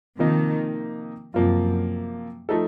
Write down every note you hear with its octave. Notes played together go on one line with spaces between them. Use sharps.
C3 D#3 F3 A#3 D#4
F#2 C3 F3 A#3 F4
F3 A3 D#4 A4